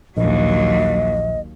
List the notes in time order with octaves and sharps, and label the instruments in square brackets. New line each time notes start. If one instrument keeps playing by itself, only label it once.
[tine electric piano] A#1 [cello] D#2 F#3 [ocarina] D#5